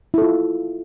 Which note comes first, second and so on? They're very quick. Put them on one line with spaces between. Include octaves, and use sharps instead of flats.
E4 A4 F4